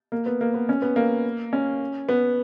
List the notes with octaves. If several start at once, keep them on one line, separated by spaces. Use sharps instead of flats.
A#3
B3
A#3
B3
C#4
B3
A#3
C#4
B3